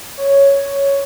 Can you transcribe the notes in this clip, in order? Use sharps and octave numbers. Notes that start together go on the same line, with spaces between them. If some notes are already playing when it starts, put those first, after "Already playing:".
C#5